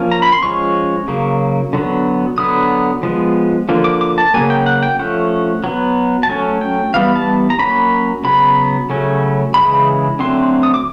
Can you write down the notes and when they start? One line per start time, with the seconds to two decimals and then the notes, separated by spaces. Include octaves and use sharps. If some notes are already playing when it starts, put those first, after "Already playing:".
Already playing: F3 A#3 C#4
0.12 A#5
0.22 B5
0.32 C6
0.43 F3 G#3 C#4 C#6
1.08 C#3 F#3 A#3
1.73 D3 F#3 B3
2.38 D3 F#3 B3 D#6
3.03 F3 G#3 B3
3.69 D3 F3 A#3
3.84 D6
4.01 D6
4.18 A5
4.34 C#3 F#3 A#3 G#5
4.50 G5
4.66 F#5
4.83 G5
4.99 F3 A3 C#4 F#5
5.64 F#3 B3
6.23 A5
6.29 F#3 A3 C#4 G#5
6.61 G5
6.94 E3 G3 B3 F5
7.16 A5
7.50 A#5
7.59 F#3 A#3 C#4 B5
8.24 C#3 F#3 B3 B5
8.90 C#3 F#3 A3 C#4
9.54 C#3 E3 G#3 B5
10.19 D3 F#3 A3 C4 C6
10.63 D#6
10.74 D6